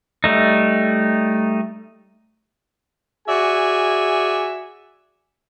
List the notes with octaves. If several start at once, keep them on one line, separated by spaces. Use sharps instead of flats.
G3 A3 D#4
F#4 G#4 D5 E5 G#5